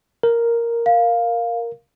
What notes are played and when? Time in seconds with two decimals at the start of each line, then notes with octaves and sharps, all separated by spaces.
0.23 A#4
0.86 F5